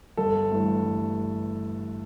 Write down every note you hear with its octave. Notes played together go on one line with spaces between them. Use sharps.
G1 A4
G2 E3 A3
G1